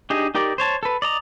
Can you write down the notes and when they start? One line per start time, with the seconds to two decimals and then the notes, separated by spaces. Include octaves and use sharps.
0.10 D4 D#4 G4 G#4 D#5
0.35 D#4 G4 A#4 D5
0.58 C5 C#5 A5
0.83 A4 B4
1.02 D5 D#5 A#5